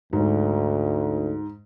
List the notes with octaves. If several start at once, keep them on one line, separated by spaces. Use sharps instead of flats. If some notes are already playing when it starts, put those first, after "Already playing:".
D2 G#2